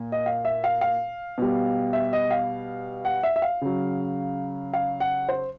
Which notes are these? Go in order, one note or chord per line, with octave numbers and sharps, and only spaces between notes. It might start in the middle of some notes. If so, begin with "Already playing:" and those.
Already playing: A#2
D#5
F5
E5
F5
F5
B2 G3
E5
D#5
F5
F#5
E5
E5
F5
C#3 F#3
F5
F#5
C5